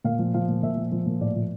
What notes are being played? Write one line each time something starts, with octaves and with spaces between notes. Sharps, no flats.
A#2 F5
F3
F3 F5
A#2
A#2 E5
F3
F3
A#2
A2 D5
F3